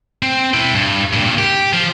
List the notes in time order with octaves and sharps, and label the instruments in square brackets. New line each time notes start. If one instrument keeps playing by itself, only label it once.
[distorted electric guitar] C4
E4 G5
G2
G2 A#2
G4
F3